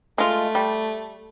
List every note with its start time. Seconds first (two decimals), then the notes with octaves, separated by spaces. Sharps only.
0.18 G#3 A3 F4
0.55 G3